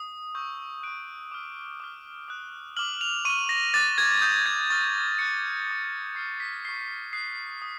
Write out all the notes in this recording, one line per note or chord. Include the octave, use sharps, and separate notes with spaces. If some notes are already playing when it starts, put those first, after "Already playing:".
Already playing: D#6
C#6 E6 G6
C#6 F#6 D7
D6 F6
D6 F6
D#6 F#6
D6 F6 F#7
F7
C#6 F6 D#7
A#6
D6 F#6 A6
G#6
D#6 G6
G#6
C#6 F6 A6
C#6 F#6 C#7
D6 F#6
C#6 F6 C7
B6
C#6 F6 C7
D#6 F#6 C7
D#6